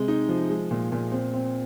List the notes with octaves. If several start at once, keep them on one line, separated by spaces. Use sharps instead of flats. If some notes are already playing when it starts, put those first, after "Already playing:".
Already playing: C3 G#3
D#4
F3
G#3
A#2
A#2
C4
C4